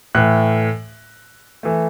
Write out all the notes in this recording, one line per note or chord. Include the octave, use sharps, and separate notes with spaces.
A2 E3 A3 F#6
E3 A3